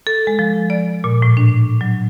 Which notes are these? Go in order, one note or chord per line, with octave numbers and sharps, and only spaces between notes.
A4
G#3
F3
D5
A#2
A2
D4
F#3